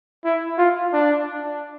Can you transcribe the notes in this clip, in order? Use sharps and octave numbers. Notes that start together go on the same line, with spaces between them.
E4
F4
D4